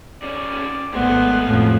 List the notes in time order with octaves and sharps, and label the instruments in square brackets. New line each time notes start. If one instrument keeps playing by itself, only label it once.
[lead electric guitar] D#2 C#4 [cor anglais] D5
[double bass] G#1 [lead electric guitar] G#3 A3 [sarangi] B3 [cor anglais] C5
[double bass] F2 A2 [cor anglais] F3